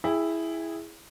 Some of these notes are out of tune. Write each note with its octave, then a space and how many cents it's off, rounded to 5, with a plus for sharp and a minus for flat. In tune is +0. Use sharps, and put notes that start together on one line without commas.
E4 +0 G#4 +0 G5 +30